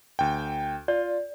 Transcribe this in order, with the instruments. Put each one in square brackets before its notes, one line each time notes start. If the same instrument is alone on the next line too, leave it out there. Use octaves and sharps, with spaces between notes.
[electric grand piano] D2 G5
[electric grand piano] F4 [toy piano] D5